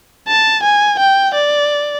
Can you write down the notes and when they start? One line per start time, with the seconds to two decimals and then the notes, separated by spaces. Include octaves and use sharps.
0.28 A5
0.63 G#5
0.99 G5
1.34 D5